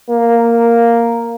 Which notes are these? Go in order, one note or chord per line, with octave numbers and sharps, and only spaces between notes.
A#3